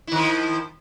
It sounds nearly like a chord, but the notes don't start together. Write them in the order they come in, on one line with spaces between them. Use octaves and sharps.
E4 D#3 F3